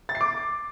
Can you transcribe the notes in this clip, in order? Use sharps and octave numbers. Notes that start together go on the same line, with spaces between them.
A6
C7
D6